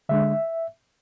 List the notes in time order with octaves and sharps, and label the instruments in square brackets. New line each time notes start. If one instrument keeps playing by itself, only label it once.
[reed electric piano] D3 G#3 D4 E5